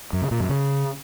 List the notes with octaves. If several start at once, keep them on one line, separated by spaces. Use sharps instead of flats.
F#2
C#3
A#2
F#2
C#3